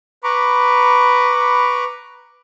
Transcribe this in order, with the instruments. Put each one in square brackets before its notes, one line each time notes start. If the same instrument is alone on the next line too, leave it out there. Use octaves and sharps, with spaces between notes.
[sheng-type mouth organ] B4 A#5 B5 C#6 D6